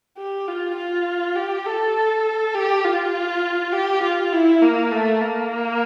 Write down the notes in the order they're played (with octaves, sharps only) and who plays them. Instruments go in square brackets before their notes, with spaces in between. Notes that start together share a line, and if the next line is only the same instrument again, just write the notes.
[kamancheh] G4
F4
F4
G4
A4
G4
F4
G4
F4
E4
A#3
A3
A#3